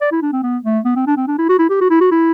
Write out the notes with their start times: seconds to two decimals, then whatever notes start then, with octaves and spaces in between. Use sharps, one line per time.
0.01 D5
0.11 E4
0.22 D4
0.32 C4
0.43 B3
0.64 A3
0.85 B3
0.95 C4
1.07 D4
1.17 C4
1.27 D4
1.38 E4
1.49 F#4
1.59 E4
1.69 G4
1.81 F#4
1.90 E4
2.01 F#4
2.11 E4